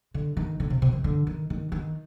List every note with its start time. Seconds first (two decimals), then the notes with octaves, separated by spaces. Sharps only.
0.14 D3
0.37 D#3
0.60 D3
0.70 C3
0.82 C3
0.93 D#3
1.04 D3
1.27 D#3
1.50 D#3
1.72 D#3